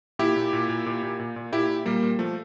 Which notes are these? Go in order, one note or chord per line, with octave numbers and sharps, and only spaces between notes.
A#2 E4 G4
A#2
A#2
A#2
A#2
A#2
A#2
A#2
A#2 E4 G4
A#2
A#2 G3 A#3
A#2
A#2 F3 A3